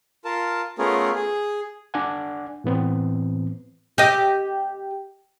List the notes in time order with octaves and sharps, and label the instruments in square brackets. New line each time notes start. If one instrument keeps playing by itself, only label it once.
[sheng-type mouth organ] F4 A#4 A5
A3 B3 C#4 F4 G#4 A#4
G#4
[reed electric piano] D4 D5 F#5 G#5
A2 E3 B3 C4
[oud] G4 D#5